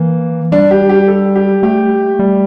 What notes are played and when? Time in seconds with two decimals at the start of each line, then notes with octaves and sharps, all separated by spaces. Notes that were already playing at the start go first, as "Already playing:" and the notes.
Already playing: E3 A#3
0.52 G3 D4
0.71 G4
0.89 G4
1.08 A4
1.36 G4
1.63 A3 G4
2.19 G3